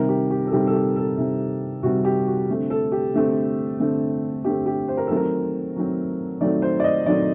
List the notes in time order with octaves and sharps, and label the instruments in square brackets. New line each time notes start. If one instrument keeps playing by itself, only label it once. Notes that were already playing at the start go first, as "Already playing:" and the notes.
Already playing: [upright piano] C3 D#3 G3 C4 A#4
G4
G4
A4
C3 D#3 G3 C4 G4
A4
G4
A4
C3 D#3 G3 C4
C3 D#3 G3 C4 F#4
G4
F#4
D3 A3 C4
A4
G4
D3 A3 C4
D3 A3 C4
D3 A3 C4 G4
G4
C5
A#4
D#3 F#3 A3 C4 A4
A#4
D#3 F#3 A3 C4
D#3 F#3 A3 C4 D5
C5
D5
D#5
D#3 F#3 A3 C4 D5